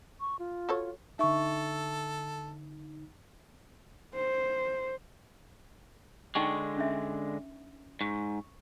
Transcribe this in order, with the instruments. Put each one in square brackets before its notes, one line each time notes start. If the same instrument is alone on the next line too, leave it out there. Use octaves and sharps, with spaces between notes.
[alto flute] C#6
F4
[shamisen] F#4 A4 C#5
[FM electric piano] D3 D#4 [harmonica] A4 [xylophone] E5 C#6
[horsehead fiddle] C5
[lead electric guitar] D3 G#3 [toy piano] D#4 G5 C#6
[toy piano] C#4 D4 E5
[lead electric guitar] G#2 [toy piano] C#6